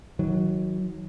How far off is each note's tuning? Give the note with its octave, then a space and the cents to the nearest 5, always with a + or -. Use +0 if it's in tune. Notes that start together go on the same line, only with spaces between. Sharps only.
D#3 +35 F#3 +0